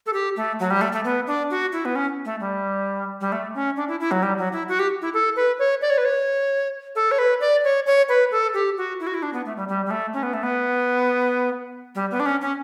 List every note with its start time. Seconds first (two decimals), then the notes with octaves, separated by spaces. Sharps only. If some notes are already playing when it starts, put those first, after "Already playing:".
0.06 A4
0.13 G4
0.36 A3
0.59 F#3
0.70 G3
0.81 A3
0.92 A3
1.04 B3
1.27 D4
1.50 F#4
1.72 E4
1.85 B3
1.95 C#4
2.25 A3
2.40 G3
3.21 G3
3.32 A3
3.54 C#4
3.76 D4
3.88 E4
4.00 E4
4.11 F#3
4.23 G3
4.38 F#3
4.52 E4
4.69 F#4
4.79 G4
5.02 E4
5.14 A4
5.36 B4
5.59 C#5
5.82 D5
5.90 C#5
5.98 B4
6.05 C#5
6.95 A4
7.11 C#5
7.18 B4
7.40 D5
7.64 C#5
7.86 C#5
8.09 B4
8.31 A4
8.54 G4
8.77 F#4
9.00 E4
9.07 F#4
9.14 E4
9.22 D4
9.33 B3
9.45 A3
9.57 G3
9.68 G3
9.86 G3
9.91 A3
10.13 C#4
10.23 B3
10.33 A3
10.43 B3
11.95 G3
12.11 B3
12.20 D4
12.26 C#4
12.41 C#4